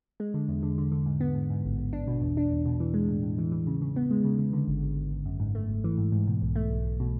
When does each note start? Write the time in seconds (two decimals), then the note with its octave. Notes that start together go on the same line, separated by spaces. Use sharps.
0.20 G#3
0.34 D3
0.48 E2
0.63 D3
0.78 D3
0.92 D3
1.06 G#2
1.20 B3
1.35 G#2
1.50 G#2
1.65 A1
1.78 A1
1.93 D4
2.07 B2
2.22 E2
2.37 D4
2.51 E2
2.66 B2
2.80 E3
2.94 G#3
3.08 A2
3.23 A2
3.38 E3
3.52 E3
3.67 C#3
3.82 C#3
3.96 B3
4.11 G#3
4.24 C#3
4.38 C#3
4.53 D3
4.68 G#1
4.83 G#1
4.96 G#1
5.11 G#1
5.25 F#2
5.40 G#2
5.55 A3
5.69 G#1
5.84 E3
5.98 G#2
6.12 G#2
6.28 B2
6.42 B1
6.55 A3
6.71 B1
6.84 B1
7.00 B2